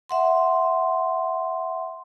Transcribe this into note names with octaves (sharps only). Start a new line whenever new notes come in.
E5 F#5 C6